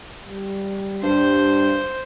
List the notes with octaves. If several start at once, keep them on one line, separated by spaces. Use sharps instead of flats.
G3
G2 C5